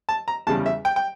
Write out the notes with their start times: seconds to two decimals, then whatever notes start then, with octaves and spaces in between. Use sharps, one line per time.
0.09 A5
0.28 A#5
0.47 E2 C#3 G3 A5
0.66 E5
0.85 G5
0.96 G5